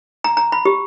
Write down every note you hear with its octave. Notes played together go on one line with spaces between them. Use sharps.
A#5
A#5
B5
G4